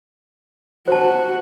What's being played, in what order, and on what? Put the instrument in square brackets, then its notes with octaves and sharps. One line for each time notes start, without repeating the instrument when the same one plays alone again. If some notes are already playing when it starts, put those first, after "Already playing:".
[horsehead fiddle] F#4 [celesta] C5 A5